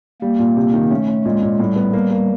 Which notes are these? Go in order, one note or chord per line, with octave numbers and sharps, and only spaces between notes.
G3 A#3
A#2
C3
D#3
A3 C#4
C#4
A#2 G#3
A#2
A2 G3
B3
A#3
A#3